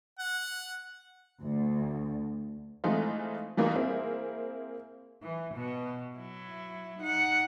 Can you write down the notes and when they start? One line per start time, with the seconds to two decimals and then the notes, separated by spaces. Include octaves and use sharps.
0.19 F#5
1.43 D2
2.84 E3 G#3 A3 C4 D#4 F4
3.57 E3 G3 A#3 D#4 F4 G#4
3.75 A#3 C4 E4 G#4
5.23 E3
5.55 B2
6.15 F#3 E4
6.99 D#4 F#5